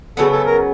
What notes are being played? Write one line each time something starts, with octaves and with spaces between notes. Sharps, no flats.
C#3 F#3 B3 A4
A4
A#4